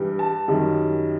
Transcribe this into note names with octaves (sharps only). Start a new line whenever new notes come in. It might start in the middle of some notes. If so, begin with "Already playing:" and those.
Already playing: G2 E3 G3
A5
F#2 D#3 G3